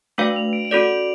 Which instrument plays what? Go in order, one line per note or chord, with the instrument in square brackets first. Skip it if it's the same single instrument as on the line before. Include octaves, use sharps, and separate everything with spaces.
[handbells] A3 D4 F#4 B4 F5 [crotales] F#7
[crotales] F7
D7
D7
[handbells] C#4 F#4 A4 D5 [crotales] F7